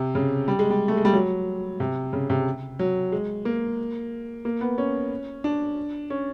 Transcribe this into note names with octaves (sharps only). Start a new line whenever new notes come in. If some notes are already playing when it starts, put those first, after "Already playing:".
Already playing: C3
C#3
G3
G#3
G3
A3
G#3
G3
F#3
C3
C#3
C3
F#3
G#3
A#3
A#3
B3
C#4
D4
C#4